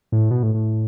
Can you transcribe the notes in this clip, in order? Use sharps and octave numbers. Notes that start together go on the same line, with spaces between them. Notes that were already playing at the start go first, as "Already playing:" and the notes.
A2
B2
A2
A2